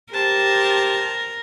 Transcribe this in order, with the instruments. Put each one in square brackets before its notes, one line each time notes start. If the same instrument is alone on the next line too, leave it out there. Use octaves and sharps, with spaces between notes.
[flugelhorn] G4 [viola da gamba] A#4 [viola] C5 A5